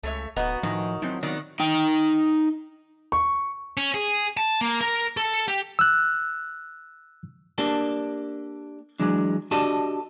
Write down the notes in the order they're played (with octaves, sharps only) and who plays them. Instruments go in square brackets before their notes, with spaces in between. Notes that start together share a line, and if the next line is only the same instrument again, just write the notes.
[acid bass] C#2 [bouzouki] A3 C#5 E5
[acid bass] D1 [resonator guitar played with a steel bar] B3 [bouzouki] D#4 F#4
[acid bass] A2 [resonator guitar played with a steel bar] D#3 [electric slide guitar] F3 G#5
[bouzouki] F3 [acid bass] F#3 [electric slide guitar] C4 D#4 E4
[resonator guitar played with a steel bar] D#3 [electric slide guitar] B3 C4 F#4 [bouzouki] D5 F#5
[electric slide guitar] D#4 G5
[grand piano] C#6
[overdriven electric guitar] C#4
G#4
A5
A#3
A#4
A4
G4
[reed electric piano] E6 F#6
[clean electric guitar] A#3 D4 G4 A4
E3 F#3 G#3 D4
D4 F#4 G4 A4 D5 D#5